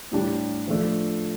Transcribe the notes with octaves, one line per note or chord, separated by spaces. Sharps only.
A2 G3 D4 G4
F3 A3 D4